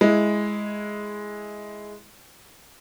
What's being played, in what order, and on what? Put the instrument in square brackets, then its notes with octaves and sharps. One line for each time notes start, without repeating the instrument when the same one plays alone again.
[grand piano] G#3 E4